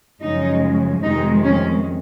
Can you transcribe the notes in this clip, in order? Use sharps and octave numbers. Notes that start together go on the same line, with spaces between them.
F#2 C#3 F3 G#3 D#4
F2 C3 D#3 G#3 D#4
C#4